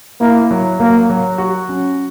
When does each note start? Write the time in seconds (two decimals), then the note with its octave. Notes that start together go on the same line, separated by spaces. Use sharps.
0.20 A#3 E4
0.51 F#3
0.80 F#3 A#3
1.09 F#3
1.38 F#4
1.69 C#4